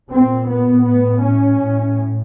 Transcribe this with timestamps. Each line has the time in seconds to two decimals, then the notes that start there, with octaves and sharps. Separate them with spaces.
0.10 A#2 C4
0.47 B3
0.84 A2 B3
1.21 C#4
1.59 A2